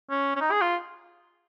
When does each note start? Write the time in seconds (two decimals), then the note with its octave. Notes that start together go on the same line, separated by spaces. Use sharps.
0.10 C#4
0.36 C#4
0.41 D#4
0.51 G#4
0.62 F4